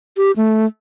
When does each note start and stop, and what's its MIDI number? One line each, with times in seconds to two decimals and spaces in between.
0.17 0.31 67
0.37 0.65 57